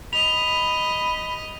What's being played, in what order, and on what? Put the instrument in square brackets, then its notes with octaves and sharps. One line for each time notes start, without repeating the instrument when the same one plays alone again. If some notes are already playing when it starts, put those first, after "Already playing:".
[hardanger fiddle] D#5 [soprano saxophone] B5 [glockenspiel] F7